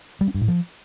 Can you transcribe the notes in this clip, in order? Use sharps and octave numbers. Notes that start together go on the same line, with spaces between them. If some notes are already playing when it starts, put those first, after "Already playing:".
G3
C#4
G2
A2
F3